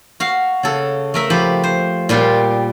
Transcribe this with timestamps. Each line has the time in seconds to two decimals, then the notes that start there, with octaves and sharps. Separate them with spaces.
0.20 F#4 F5
0.63 C#3 A4
1.14 A3 A#4 E5
1.30 F3 G4 B4
1.64 C5
2.09 A#2 G3 F4 G4